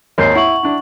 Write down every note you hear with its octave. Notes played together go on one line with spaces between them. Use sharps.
G#1 D#2 A#3 C#5 G6 C7
E4 F#5 C#6 F#7
D4 E4